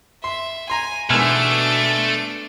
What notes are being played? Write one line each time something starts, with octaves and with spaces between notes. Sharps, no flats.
E5 C6
G#5 A#5 C6
G#2 B2 E3 A3 D4 G#5 F6 D7